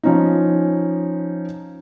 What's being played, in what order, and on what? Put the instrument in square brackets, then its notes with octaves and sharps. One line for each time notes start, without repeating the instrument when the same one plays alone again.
[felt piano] F3 C#4 D#4